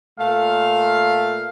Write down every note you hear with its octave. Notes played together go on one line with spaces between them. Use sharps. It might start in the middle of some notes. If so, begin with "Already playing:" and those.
A#2 A3 F5